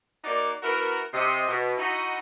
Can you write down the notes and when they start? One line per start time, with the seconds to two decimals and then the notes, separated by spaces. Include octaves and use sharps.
0.23 A#3 D#4 F#4 D5
0.62 B3 E4 F#4 A#4
1.13 C3 D#5
1.48 B2
1.77 D#4 E4 F#4